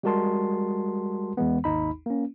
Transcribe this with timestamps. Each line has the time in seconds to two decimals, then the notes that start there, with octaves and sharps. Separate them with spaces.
0.03 G3 G#3 F#4 A#4 A5 C6
1.37 E2 E3 G#3 B3
1.64 G#1 D#2 D#4 B5
2.06 A#3 C#4